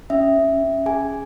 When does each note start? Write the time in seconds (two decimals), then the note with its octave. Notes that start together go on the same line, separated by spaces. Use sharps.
0.10 C#4 E5
0.36 C#4
0.61 C#4
0.86 G#4 G#5